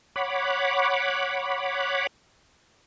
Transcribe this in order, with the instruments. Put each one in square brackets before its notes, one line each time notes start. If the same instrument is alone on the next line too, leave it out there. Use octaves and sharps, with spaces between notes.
[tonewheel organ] C#5 F#5 B5 D6